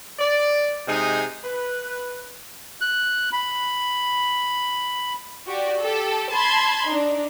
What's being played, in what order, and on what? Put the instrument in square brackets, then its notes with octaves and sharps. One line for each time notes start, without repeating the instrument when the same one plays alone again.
[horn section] D5
C3 G#3 D#4 G#4
B4
[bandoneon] F#6
B5
[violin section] F#4 G4 D5
G4 A4
A5 B5 C6 G#6
D4 D#4